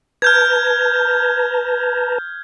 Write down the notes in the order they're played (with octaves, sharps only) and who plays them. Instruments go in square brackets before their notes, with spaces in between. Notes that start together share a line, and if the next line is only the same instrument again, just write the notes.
[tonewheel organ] B4 A5 A#5 [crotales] F6 G6 G#6